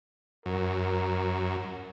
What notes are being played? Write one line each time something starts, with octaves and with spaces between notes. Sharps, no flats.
F#2 A#4